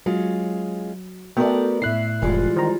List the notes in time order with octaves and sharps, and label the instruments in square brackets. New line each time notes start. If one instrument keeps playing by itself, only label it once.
[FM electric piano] F#3 [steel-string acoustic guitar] G#3 C#4 F4
[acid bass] A3 [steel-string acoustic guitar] B3 A#4 D5 [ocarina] F#4 [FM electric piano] A4 G5
[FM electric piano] A2 F#6 C7 [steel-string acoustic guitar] E4 [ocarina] E5
[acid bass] F1 [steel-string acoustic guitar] E3 G3 G#3 [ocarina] F4
[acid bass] D#3 [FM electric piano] C5 A#5